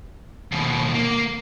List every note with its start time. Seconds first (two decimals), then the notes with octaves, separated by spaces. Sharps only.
0.52 D#2 B2
0.95 A#3